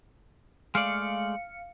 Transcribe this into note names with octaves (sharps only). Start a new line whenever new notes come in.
G#3 A3 D5 F5 C#7